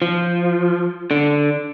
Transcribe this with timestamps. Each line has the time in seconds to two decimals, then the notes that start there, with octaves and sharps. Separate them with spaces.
0.02 F3
1.11 D3